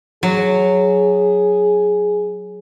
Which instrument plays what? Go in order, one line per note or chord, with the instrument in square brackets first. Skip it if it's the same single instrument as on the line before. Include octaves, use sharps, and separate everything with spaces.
[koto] F#3 [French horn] G#4